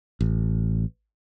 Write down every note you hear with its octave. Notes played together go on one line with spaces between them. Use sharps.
A1